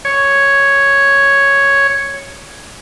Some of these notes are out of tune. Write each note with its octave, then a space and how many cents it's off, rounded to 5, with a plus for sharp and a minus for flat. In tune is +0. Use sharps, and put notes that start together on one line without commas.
C#5 +0